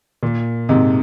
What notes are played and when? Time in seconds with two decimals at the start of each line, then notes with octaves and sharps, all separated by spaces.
0.23 A#2
0.69 G#2 C3